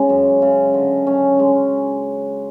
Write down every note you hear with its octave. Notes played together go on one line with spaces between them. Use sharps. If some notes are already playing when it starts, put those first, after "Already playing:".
Already playing: C#3 G#3
F#2
C#3
D3
C#4
G#3